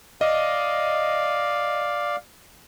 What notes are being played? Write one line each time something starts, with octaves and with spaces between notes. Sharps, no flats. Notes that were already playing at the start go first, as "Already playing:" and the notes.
D5 D#5 F5